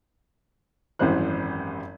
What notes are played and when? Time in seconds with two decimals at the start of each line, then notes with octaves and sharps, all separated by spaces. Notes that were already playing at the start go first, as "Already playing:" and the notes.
0.99 G#1 F#2 E3 G3 C5 F#6